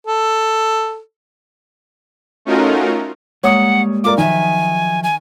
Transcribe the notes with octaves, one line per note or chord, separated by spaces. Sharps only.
A4
A3 C#4 D#4 F4 F#4 A#4
G3 G#3 A#3 C#5 F#5 D#6
F4 A#4 D5 D6
D#3 F3 F#3 E5 G#5
G#5